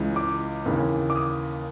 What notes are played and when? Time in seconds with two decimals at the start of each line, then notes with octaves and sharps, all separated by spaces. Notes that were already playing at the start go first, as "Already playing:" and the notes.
Already playing: C#2 C#3 E3
0.16 D6
0.66 D#2 C#3 E3
1.10 D6
1.15 D#6